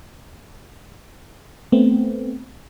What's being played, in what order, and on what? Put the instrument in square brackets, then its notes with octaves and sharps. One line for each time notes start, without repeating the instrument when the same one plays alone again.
[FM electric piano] A3 B3 C4